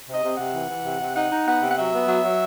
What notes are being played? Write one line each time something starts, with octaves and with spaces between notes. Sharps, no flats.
C3 D#5
C3
C3 F#5
E3
E3
C3
C3
D#4 F#5
D#4
B3 F#5
C3
F#5
F#3 E5
B3
F#3
F#3